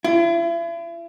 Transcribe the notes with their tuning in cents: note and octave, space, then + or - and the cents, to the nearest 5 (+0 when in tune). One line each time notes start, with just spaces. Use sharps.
E4 +40